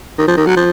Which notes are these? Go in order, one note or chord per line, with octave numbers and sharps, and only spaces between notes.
D#3
F3
D#3
F#3
F3